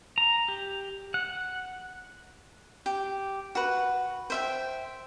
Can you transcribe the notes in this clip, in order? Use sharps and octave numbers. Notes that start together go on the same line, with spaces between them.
A#5
G4
F#5
G4
F#4 B4
C5 E5 G5